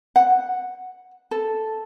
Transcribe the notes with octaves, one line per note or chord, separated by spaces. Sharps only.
F#5
A4